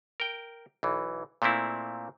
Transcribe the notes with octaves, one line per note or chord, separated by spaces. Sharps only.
A#4 G5
B1 E3
A#2 A3 A#3 C4 E4